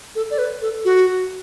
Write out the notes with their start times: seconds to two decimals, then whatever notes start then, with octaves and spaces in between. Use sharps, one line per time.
0.15 A4
0.31 D5
0.38 B4
0.62 A4
0.85 F#4